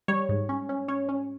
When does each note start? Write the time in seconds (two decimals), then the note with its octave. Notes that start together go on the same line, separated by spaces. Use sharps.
0.08 G3 C#5
0.29 G#2
0.49 C#4
0.69 C#4
0.88 C#4 C#5
1.09 C#4